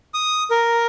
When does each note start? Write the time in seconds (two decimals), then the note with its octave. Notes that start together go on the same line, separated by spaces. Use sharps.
0.14 D#6
0.51 A#4